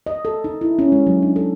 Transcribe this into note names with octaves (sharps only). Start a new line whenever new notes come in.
D#5
A4
D#4
E4
C#4
G#3
F#3
D4
A4